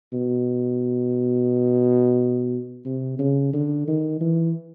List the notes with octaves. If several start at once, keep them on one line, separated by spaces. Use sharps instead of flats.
B2
C3
C#3
D3
D#3
E3